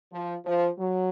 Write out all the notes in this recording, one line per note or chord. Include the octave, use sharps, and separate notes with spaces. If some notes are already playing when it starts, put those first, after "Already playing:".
F3
F3
F#3